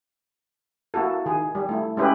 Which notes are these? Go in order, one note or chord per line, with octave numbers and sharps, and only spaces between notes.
A#3 E4 F#4 A4
D#3 G#4
G3
A3 E4
G#3 C#4 E4 G4 B4